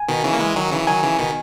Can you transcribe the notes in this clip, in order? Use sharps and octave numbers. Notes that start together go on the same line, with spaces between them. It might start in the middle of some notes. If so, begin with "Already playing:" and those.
Already playing: G#5
B2 D#3
C#3 E3
A#3
E3 G#3
D#3 F#3
C#3 E3
D#3 F#3 G#5
C#3 E3
B2 D#3